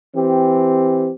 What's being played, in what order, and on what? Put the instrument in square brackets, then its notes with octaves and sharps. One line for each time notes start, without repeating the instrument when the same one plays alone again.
[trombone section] E3 C4 G4